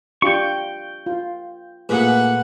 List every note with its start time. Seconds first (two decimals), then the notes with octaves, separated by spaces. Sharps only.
0.22 D4 F4 G4 G5 C#6
1.06 F4
1.89 A#2 A3 G#4 B4 F#5